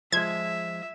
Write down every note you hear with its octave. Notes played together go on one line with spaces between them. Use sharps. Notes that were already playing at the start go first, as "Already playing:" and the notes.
F3 G#3 E5 G#6